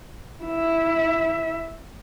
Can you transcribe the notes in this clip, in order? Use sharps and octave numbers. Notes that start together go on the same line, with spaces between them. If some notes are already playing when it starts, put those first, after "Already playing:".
E4 E5